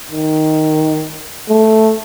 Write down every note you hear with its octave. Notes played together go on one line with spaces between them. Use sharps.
D#3
A3